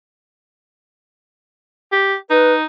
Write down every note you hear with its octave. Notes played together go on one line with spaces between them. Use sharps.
G4
D#4 B4